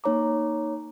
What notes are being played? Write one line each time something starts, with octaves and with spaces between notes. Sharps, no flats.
A#3 D#4 C#5 A#5 D6